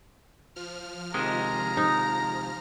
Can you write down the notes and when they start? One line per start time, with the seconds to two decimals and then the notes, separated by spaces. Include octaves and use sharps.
0.56 F3 F6
1.14 C3 D#3 G#3 A#5
1.77 D#4